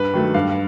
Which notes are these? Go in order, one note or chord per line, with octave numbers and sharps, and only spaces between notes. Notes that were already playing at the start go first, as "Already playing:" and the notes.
Already playing: G2 B4
D#3 F#3 A3
G2 F5